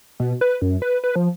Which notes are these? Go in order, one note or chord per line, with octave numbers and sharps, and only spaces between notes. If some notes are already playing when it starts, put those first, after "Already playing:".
B2
B4
F#2
B4
B4
F3